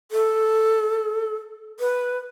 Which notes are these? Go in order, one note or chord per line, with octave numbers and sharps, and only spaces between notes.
A4
B4